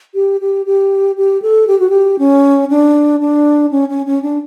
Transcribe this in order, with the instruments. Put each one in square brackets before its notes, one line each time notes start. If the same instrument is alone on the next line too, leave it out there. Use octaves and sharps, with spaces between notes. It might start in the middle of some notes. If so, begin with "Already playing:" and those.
[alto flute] G4
G4
G4
G4
A4
G4
F#4
G4
C#4
D4
D4
C#4
C#4
C#4
D4